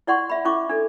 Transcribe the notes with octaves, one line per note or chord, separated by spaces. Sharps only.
E4 D5 F#5 C6 C#6
E5 B5
C#4 E4 C#6 D6
D4 A4